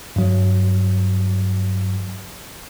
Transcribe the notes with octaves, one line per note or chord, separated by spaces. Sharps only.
G2 F#3